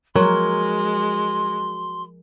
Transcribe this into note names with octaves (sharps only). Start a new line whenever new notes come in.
F3 F#3 G#3 A#4 C6